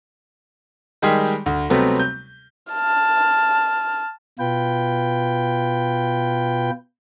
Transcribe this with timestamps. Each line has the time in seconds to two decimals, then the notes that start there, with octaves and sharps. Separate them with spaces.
1.02 D#3 G3 G#3 G4 G#4
1.46 D2
1.70 C3 F#3 G3 A3 B3 C4
1.99 G6
2.73 A5 F6
4.39 B2 F4 B4 G5